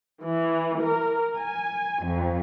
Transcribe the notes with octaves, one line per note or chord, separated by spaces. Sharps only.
E3
A#4
G#5
F2